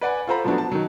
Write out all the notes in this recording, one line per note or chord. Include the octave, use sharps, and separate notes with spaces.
B4 D5 F#5 G#5
F4 A4 C5 F#5 A#5 B5
F3 F#3 A3 B3 D4 F#4
A5
D#3 F#3